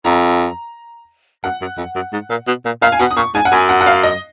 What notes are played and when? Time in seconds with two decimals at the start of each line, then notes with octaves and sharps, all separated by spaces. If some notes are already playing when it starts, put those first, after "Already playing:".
0.05 F2 A#5
1.44 F#2 F#5
1.61 F#2
1.77 F2
1.95 F#2
2.13 G#2
2.30 A#2
2.47 B2
2.65 A#2
2.82 A#2 F5
2.92 G#5
2.99 B2 F#5
3.11 D#6
3.17 A#2 C#6
3.35 G#2 G#5
3.45 F#5
3.52 F#2 G#5
3.69 F#5
3.81 F#5
3.86 F5
4.03 D#5